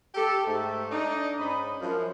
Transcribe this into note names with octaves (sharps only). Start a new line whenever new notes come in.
G4 A4
G#2 A3
D4 D#4
G#2 C#4 D#5 B5
F#2 F3